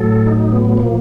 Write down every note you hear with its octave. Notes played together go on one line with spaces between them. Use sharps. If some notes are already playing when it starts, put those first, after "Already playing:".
Already playing: A2 F#3 A4
D#4
D#4
B3
B3
A#2 F3 A#3